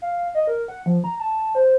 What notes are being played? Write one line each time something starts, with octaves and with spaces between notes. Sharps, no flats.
F5
D#5
A#4
F#5
F3
A#5
A5
C5